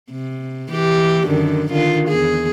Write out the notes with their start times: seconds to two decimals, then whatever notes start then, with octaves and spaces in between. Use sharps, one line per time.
0.11 C3
0.71 E3 G4
1.26 F#2 D3 D#3
1.72 D3 D#3 F4
2.08 E2 G#4